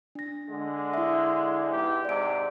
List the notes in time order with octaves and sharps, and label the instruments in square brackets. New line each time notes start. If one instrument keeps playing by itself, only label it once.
[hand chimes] D4 A#6
[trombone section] D3 G#3
[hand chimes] E4 E5
[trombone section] G#2 B3 G4
[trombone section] G#2 C3 [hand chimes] D5 D7